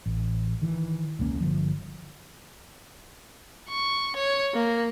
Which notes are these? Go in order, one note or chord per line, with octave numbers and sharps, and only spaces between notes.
A1
D#3 E3
E1 C#2 A#3 C#4
G1 F#2 D3 F3
C#6
C#5
A#3